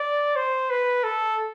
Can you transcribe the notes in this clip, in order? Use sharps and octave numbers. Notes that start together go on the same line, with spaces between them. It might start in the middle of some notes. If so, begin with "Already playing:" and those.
Already playing: D5
C5
B4
A4